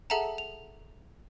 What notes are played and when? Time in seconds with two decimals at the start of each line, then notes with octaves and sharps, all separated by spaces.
0.10 G#4 A4 E5 F#5 A5 A#5
0.38 F7